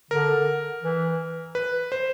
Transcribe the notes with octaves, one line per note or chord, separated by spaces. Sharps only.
D3 A#4
E3
B4
C5